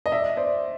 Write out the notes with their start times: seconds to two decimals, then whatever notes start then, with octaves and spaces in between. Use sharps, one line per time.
0.06 D#5
0.12 D5 E5
0.37 C5 D5